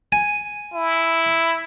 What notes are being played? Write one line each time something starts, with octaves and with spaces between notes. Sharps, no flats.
G#5
E4